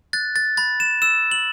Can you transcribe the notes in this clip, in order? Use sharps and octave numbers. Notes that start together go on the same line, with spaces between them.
F#6 A6
A6
B5 A6
E7
E6 E7
F#7